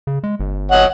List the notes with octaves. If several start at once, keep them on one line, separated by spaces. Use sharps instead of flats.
C#3
G#3
G1
C#5 D#5 F#5